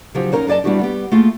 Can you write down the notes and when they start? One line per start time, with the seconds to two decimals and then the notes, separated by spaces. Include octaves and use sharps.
0.14 C#3 F3 F#3 D#4 G4 C5
0.32 C#4 D#4 F4 A#4 C5 C#5
0.47 F#2 G#4 D5 D#5 A5
0.64 G3 B3 D4 E4 F#4 G4
0.79 G3 B3 G4
1.12 A3 A#3 F4 G#4